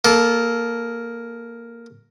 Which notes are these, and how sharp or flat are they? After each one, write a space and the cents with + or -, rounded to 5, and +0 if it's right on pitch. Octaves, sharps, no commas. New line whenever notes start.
A#3 +0 A4 -20